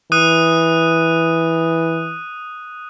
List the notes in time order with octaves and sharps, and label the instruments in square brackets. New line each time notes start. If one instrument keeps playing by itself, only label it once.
[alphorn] E3 [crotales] D#6 F#6 D#7